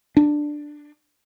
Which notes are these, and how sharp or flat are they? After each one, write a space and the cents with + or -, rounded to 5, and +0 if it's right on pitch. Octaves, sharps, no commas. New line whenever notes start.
D4 +10